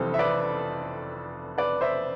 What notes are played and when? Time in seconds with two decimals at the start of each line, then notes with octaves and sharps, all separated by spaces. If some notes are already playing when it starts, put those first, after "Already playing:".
Already playing: F1 F2 E3 G3 A4 C5
0.14 E5
0.19 B4 D5
1.58 B4 D5
1.81 C5 E5